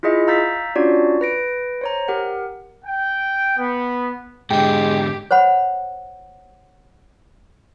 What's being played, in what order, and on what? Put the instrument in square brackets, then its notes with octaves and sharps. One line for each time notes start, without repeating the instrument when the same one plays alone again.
[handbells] E4 F4 G#4 D#5 E5
F5 A#5 E6 G6 A6 B6
C#4 D4 F4 F#4 C#5 D5
B4 A#6 D7
C5 C#5 A#5
G4 A#4 F#5
[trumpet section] G5
B3
[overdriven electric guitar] G#2 D3 [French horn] G#3 [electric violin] G4 [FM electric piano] G5
[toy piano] C5 C#5 F#5 B5